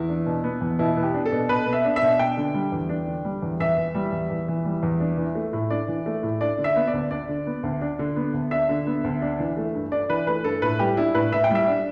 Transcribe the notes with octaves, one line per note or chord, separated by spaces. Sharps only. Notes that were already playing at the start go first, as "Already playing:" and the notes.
Already playing: E2 E4
D4
B2
B3
E2
B2 E4
B3
G4
D4
A4
B2
B2 B4
B3
E5
D4
E5
B2
D4 G5
D3
G3
E2
D4
D3
G3
E2
E2 E5
E3
G3
E2
E2
E3
G3
E2
D4
E3
A3
A2
D4 D5
E3
A3
A2
D4 D5
D3
E5
B3
D5
D2
D4 D5
D3
B3
D2
D4
D3
B3
D2
D4 E5
D3
B3
D2
D4
E3
A3
G2
D4 D5
E3 B4
A3 B4
G2 A4
A2 B4
G3 G4
D4 E4
A2 B4
A2 E5
G5
G3 E5
D4